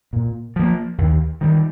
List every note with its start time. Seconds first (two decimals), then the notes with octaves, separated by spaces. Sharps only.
0.13 A#2
0.56 F3 A#3
0.98 D#2
1.41 D#3 G3